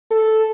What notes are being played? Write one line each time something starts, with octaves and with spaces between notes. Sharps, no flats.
A4